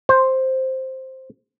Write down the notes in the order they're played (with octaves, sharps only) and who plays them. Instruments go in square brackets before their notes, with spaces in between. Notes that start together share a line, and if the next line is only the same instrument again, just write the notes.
[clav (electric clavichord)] C5